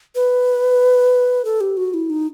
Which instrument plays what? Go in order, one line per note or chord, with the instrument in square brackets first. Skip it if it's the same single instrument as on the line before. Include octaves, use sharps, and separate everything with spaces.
[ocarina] B4
A4
G4
F#4
E4
D#4